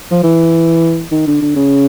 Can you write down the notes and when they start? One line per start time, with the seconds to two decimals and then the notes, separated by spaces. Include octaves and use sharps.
0.11 F3
0.23 E3
1.11 D#3
1.27 D3
1.41 D3
1.56 C#3